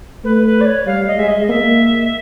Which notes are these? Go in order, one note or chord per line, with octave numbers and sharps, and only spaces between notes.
A3 B4
B4
D5
C#5
G3 F5
D#5
G#3 E5
D#5
A#3 E5